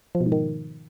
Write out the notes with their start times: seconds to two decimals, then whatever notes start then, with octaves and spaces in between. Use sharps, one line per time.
0.15 F3
0.20 B2
0.26 G#2
0.32 D#3